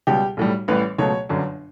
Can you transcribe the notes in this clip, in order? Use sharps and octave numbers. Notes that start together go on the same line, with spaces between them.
C#2 B2 G3 G4
B1 A2 G3
A1 A2 E3 G3 B4
C#2 B2 F#3 A3 C#5
G1 F#2 D3